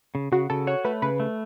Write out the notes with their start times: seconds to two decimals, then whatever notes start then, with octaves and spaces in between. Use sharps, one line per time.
0.15 C#3
0.32 C#3 F#4
0.50 C#3 A4
0.67 F#4 C#5
0.85 A3 B4
1.02 C#3 B4
1.20 A3